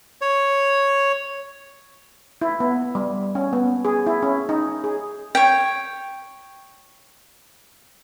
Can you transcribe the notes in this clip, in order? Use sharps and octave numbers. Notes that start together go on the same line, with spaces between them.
C#5
E4
B3
G3
C#4
B3
G#4
E4
C#4
D#4
G#4
C#5 G5